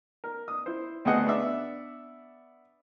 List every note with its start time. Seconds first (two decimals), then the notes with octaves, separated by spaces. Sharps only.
0.24 A#4
0.48 D#6
0.66 E4 C5
1.05 D2 B3 C4 G#4 D#5 F#5
1.26 B3 D4 D5 E5